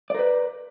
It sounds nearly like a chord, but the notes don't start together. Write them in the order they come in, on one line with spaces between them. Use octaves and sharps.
D5 A#4 B4